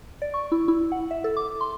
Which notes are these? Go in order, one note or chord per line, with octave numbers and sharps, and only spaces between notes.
D5
C#6
E4
E4
F#5
E5
A4
D6
C6